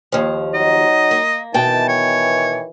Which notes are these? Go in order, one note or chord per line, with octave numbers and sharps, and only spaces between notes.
D#2 F3
F#3 D#4 D#5
A#3
B2 D#3 E3 G5 A5
C#5